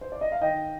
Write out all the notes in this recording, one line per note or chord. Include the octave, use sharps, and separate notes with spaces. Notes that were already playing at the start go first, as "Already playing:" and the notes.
C5
D5
D#5
F5
D#3 D#5 G5